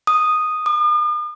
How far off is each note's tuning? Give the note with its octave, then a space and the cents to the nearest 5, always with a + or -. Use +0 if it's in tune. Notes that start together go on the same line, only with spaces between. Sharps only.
D#6 -5
D#6 -45